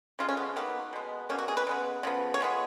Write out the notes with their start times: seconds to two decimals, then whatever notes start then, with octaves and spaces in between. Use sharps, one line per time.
0.19 C#3 F3 G#3 F4
0.29 C#4
0.37 B3
0.56 D#3 F#3 A#3 B3
0.93 B2 G#3 B3
1.29 B2 A#3 C#4
1.38 F#4
1.48 G#4
1.57 B4
1.67 C#3 G#3 B3
2.03 C#3 F3 B3
2.34 C#5
2.40 F3 G#3 B3